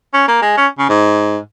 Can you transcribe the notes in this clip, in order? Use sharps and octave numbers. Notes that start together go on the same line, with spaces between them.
C#4
A#3
G#3
C#4
C#3
G#2